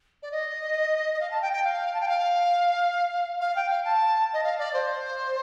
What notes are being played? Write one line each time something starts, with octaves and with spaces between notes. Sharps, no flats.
D5
D#5
D#5
F5
A5
G5
G5
F5
A5
G5
F5
F5
G5
F5
A5
D#5
F5
D5
C5